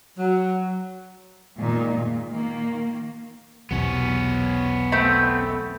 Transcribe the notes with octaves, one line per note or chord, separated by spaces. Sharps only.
F#3
A#2 D#3 G#3 D#4
A#2
D#3 A#3
B1 E2 C3 B3 C#4
A3 C4 B5